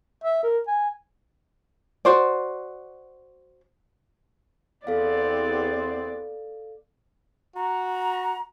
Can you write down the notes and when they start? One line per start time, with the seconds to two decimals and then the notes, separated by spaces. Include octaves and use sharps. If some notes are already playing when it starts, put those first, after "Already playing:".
0.24 E5
0.43 A#4
0.68 G#5
2.05 F#4 C5 D5
4.87 E2 B3 C4 A4 D5 F5
7.56 F#4 A#5